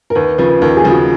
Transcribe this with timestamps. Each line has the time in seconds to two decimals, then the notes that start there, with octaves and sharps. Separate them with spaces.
0.10 A#4
0.15 D#2 B4
0.38 C#3 F3 B4
0.61 D#2 A#4
0.77 G#4
0.84 C#3 F3
0.91 F#4